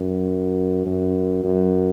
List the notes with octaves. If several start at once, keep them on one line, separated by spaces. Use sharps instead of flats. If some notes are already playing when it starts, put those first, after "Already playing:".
Already playing: F#2
F#2
F#2